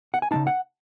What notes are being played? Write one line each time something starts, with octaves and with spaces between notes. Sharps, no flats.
F#5
G#5
C#3 G#3 D#4 A5
F#5